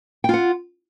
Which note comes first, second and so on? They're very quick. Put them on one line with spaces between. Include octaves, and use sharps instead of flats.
G5 F4 F#5